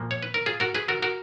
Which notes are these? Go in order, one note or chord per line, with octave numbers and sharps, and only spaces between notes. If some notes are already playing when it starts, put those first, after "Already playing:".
Already playing: A#2 F3 A#3
C#5
B4
A#4
F4 G#4
F#4 A#4
G#4 B4
F#4 A#4
F#4 A#4